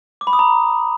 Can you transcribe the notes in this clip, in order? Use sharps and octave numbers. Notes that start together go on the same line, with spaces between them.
D6
B5
D#6
A#5